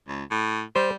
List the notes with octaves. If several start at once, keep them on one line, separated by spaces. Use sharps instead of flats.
C#2
A2
G3 C5